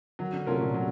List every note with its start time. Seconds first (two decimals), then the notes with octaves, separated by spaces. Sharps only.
0.19 D#3 F#3
0.33 D3
0.47 C3 A3 C#4 F4 A#4
0.61 A#2
0.74 C3 F#3